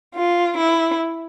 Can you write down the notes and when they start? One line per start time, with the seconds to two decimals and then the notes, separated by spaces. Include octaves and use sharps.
0.15 F4
0.57 E4